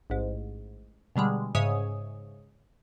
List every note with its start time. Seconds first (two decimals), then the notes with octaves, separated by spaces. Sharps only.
0.10 A1 G#2
1.16 B2 D3 G3 G#3
1.55 G#2 C#3 C#5 E5 G#5 D#6